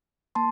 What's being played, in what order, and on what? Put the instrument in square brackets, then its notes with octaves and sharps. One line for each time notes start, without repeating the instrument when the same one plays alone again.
[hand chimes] A#3 A5 C6